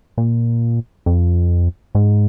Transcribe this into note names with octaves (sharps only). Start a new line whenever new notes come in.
A#2
F2
G#2